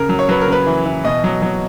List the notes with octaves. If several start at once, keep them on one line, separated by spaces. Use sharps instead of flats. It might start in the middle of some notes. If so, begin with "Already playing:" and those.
Already playing: C#3 A#4
F#3
C#5
F#3 B4
A#4
C#3 B4
E3
E3
B2 D#5
F#3
F#3